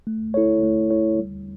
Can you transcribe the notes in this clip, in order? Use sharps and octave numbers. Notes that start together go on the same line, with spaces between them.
A3
E4 A4 C#5
A3
E4 A4 C#5
G3